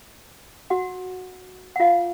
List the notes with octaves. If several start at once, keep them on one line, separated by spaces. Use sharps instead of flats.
F#4 F#5
F#5
F4 F5